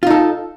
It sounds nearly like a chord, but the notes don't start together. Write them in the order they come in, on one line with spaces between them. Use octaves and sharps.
F4 D#4 A4